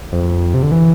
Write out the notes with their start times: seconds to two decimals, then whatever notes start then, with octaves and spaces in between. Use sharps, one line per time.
0.13 F2
0.54 C3
0.63 D3
0.71 E3